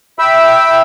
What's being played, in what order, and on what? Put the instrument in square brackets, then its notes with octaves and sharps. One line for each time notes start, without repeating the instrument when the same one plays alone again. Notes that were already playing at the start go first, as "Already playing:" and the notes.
[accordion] E5 G5 B5 E6